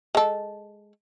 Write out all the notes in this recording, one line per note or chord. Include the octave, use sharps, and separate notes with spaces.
G#3 A4